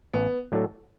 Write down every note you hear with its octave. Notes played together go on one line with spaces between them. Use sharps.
A1 B3
A2 F#3 D4 A4